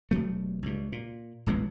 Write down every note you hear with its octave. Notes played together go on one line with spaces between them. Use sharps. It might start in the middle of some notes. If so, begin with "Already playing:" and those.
E1 G2 F#3 A3
C#2 G2
A#2
D#1 A1 G#3 B3